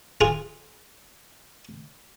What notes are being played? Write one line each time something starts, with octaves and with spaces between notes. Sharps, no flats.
F4 G#4